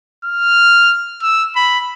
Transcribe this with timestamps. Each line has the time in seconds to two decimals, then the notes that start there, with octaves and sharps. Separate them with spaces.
0.25 F6
1.22 E6
1.56 B5